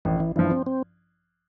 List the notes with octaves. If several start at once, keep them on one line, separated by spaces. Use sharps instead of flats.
A1 E3
E3
G2 E3 F3
C4
C4